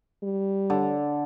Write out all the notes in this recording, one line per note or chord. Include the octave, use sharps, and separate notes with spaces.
G3
D3